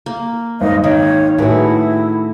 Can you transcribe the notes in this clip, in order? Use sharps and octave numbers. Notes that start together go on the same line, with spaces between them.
A#3
G#1 C5 D#5 F5
D#3 C#5
A2 E4 F#4 G#4 B4 C#5